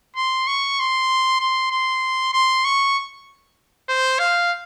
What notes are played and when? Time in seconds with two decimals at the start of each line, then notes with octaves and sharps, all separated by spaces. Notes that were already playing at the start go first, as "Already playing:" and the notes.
0.16 C6
0.47 C#6
0.79 C6
1.40 C6
1.71 C6
2.33 C6
2.65 C#6
3.89 C5
4.19 F5